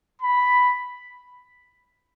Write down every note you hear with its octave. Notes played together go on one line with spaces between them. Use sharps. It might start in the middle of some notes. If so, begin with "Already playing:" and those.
B5